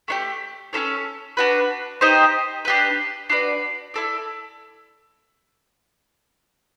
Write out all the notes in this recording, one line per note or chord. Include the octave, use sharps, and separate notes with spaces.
A3 D4 G4
C#4 E4 A4 C#5
D4 F#4 B4
D#4 G4 C5 D#5
D4 G4 B4
D4 F#4 B4 D5
E4 A4 D5